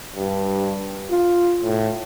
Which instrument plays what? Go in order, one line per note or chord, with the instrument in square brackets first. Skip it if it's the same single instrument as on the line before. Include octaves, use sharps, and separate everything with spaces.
[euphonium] G2
F4
A2